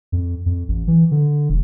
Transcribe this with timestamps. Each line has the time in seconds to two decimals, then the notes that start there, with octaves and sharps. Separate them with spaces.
0.12 F2
0.46 F2
0.68 A1
0.88 E3
1.11 D3
1.49 E1